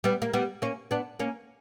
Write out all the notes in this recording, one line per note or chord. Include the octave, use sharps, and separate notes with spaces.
G3 B3
A#3
G3 B3
A#3 C#4
B3 D4
A#3 C#4